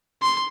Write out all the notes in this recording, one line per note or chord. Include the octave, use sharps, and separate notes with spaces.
C6